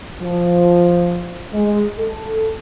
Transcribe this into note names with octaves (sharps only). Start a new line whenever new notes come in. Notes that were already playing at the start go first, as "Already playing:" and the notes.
F3
G#3
A4